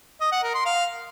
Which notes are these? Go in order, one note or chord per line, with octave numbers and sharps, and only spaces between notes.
D#5
F#5
A#4
C6
F5